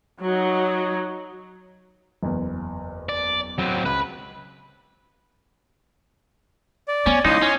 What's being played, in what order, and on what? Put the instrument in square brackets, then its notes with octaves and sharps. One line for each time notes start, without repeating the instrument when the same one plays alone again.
[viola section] F#3 D#4
[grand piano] F#1 E2
[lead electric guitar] D5
F#3 C4
[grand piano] C#2 [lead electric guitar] B4
[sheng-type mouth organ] D5
[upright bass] B3 [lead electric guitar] C#4
[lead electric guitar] C#2 [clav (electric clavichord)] D#4 [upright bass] E4 [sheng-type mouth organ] D#5 C6
[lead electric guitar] C#4